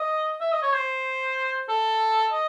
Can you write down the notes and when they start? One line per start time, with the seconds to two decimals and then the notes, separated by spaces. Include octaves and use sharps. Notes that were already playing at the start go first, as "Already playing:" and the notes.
Already playing: D#5
0.41 E5
0.52 D#5
0.62 C#5
0.73 C5
1.69 A4
2.32 D#5